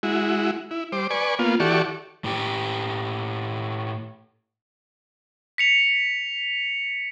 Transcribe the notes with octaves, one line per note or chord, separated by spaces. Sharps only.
G#3 E4 F#4
E4
G3 C5 D6
B4 D5 G#5 C#6
A#3 B3 F4
E3 F#4 G4 A4 D5 C#6
A2 G4
B6 C#7 F7